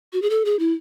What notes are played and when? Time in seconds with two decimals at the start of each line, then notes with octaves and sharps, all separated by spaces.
0.13 F#4
0.22 G#4
0.30 A4
0.45 G#4
0.59 E4